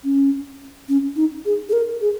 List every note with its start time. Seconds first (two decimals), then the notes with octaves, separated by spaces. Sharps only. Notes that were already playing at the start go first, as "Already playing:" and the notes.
0.04 C#4
0.88 C#4
1.16 D#4
1.45 G#4
1.69 G#4
1.73 A#4
2.01 G#4